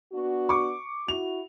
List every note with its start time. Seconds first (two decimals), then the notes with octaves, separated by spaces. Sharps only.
0.13 B3 D4 F#4
0.49 C#6 D6
1.08 E4 F#4 F7